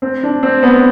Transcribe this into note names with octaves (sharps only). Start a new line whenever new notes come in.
C4
D4
C4
B3